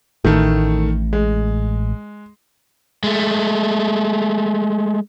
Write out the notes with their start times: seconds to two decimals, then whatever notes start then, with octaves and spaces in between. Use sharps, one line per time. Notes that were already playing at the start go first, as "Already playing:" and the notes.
0.25 A1 A2 D#3 A3
1.13 G#3
3.04 G#3 A3